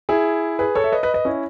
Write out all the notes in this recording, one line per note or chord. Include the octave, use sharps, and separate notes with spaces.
E4 G#4
G#4 B4
A4 C#5
E5
B4 D#5
B4 D#5
B4 D#5
C#4 E4